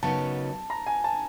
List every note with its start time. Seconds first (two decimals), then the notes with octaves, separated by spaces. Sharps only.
0.03 F#2 C#3 F#3 B3 D#4 A5
0.70 A#5
0.86 G#5
1.04 A5